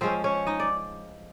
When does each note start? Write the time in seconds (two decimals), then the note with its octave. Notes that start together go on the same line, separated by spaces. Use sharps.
0.01 F3 G#3 C4 C#4 C5
0.24 C#4 C#5
0.47 D#4 D#5
0.60 D5